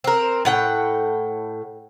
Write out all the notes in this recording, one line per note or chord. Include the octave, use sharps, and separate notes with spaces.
C4 A#4
A2 F#5 G5